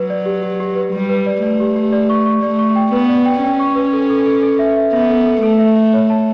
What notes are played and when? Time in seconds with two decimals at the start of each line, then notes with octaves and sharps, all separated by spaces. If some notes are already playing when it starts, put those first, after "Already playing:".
Already playing: F#3 B4
0.10 D5
0.26 G4
0.43 G4
0.60 G4
0.76 B4
0.92 G3 G4
1.09 B4
1.26 D5
1.43 A3 D5
1.60 G4
1.76 G4
1.92 D5
2.10 C#6
2.26 C#6
2.43 A3 D5
2.59 C#6
2.76 G5
2.92 B3 B4
3.09 D5
3.26 G5
3.43 C#4 G5
3.60 C#6
3.76 B4
3.93 A4
4.10 A4
4.26 A4
4.43 A4
4.59 E5
4.77 E5
4.93 B3 E5
5.10 A4
5.26 A4
5.42 A3 A4
5.59 E5
5.76 E5
5.94 C#5
6.10 A5